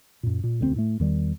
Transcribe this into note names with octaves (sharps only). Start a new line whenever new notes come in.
F#2 A#2
A#2
E1 D2 F#3 C4
A2 A3
E2 D#3 G3